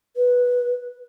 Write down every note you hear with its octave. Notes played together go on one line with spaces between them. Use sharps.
B4